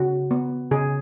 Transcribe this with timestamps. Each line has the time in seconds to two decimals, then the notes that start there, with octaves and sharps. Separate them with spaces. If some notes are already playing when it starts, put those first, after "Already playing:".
Already playing: C#3 F#4
0.31 B3
0.71 C#3 G#4